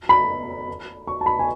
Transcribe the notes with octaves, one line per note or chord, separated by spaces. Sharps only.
B5
C#6
A5
B5
G#5